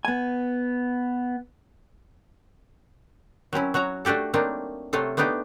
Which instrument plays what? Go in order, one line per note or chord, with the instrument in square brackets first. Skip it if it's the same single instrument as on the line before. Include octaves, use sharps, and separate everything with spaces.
[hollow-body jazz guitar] B3 G#5
[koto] F#3 C4 C#4 E4
F#3 F#4 C#5 A#5
A3 D4 F#4 G4 A4
F#3 A3 A#3 C4 D4 D#4
C3 F#3 A3 F4 A4
A3 B3 D4 D#4 G4